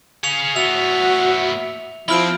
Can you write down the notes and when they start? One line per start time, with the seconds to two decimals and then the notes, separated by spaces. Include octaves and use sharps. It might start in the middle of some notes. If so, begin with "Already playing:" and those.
0.23 G#4 F5 C#7 F7
0.56 A2 B3 F#4 E5 F7
2.09 F3 C4 E4 B5 F6 D7